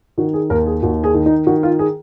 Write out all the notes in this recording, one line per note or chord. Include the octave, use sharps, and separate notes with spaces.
D#3 F#4
G#4
D#2 A#4
G#4
D#2 F#4
G#4
D#3
D#4
D#3 F#4
F4
G#4